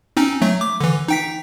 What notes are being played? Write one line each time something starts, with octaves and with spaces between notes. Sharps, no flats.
C4 C#4 D#4
F#3 A3
D6
D3 E3
D#4 G5 B6